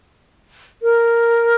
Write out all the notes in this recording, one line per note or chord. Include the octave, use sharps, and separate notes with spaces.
A#4